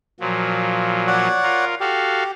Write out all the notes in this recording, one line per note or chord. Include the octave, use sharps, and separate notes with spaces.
A#2 F3 F#3
C#5 D5 F#5
F4 A#4
F#4 G4 A4 F5